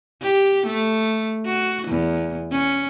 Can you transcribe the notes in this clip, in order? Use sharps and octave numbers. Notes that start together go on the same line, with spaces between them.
G4
A3
F#4
E2
C#4